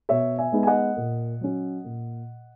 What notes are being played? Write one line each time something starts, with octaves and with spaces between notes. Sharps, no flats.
B2 C#5 E5
E5 G#5
G#3 B3 D#4
G#5
D#5 F#5
A#2
F#3 C#4
A#2